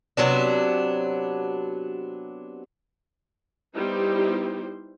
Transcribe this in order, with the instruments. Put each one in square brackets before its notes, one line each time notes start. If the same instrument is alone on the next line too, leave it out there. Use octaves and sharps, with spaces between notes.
[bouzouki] C3 F#3 B3 D4
[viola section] G3 B3 D#4 E4 G4 C5